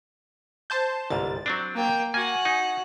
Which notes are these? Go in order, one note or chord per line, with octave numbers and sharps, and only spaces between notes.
C5 A5 G6
G1 C2 G#2 A6
F#3 C4 D4
A#3 G5
A#3 F#4 F#5 G#5
D#4